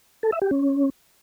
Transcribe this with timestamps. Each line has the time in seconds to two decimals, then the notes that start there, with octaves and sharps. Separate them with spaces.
0.23 A4
0.32 E5
0.42 G4
0.51 C#4